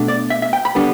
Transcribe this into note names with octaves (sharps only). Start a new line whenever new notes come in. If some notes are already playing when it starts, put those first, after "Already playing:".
Already playing: B2 A3 D4
D5
E5
E5
G5
B5
D3 G3 B3 D4